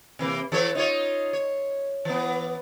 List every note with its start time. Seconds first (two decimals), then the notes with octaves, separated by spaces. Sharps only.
0.19 C3 E3 A#3
0.52 E3 A4 C#5
0.75 D#4 F4 C#5
1.33 C#5
2.05 E3 B3